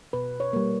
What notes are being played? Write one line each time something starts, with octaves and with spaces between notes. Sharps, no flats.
B2 B4
C#5
G3 A#3